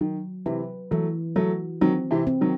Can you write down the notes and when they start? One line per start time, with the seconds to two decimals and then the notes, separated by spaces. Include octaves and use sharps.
0.01 D#3 F#3
0.46 C3 E3 B4
0.91 E3 F#3 A3
1.36 F#3 A3 F#4
1.81 D#3 F#3 C4
2.11 C3 E3
2.27 C4
2.41 D#3 F#3